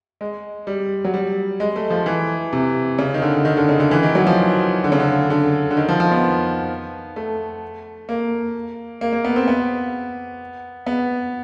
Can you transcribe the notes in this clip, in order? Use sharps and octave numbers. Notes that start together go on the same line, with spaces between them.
G#3
G3
F#3
G3
G#3
A3
F3
E3
C3
C#3
D#3
D3
D#3
D3
C#3
D3
E3
D#3
F#3
F3
D3
C#3
D3
D3
D3
D#3
F3
F3
B3
A3
A#3
A#3
A#3
B3
C4
B3
B3